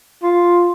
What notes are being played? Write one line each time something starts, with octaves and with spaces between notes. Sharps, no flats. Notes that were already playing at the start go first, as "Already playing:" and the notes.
F4